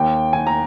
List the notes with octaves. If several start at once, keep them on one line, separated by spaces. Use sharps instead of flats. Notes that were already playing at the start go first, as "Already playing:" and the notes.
Already playing: D#2 G5
D#3 G#5
A#5